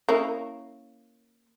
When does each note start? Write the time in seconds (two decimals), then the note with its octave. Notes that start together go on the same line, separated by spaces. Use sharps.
0.09 A#3 C#4 E4